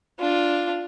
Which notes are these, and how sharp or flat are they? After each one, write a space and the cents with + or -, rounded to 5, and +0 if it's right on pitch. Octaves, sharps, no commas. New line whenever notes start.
D4 +0 F4 +0